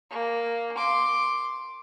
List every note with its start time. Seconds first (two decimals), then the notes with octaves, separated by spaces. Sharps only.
0.11 A#3
0.77 C6 D6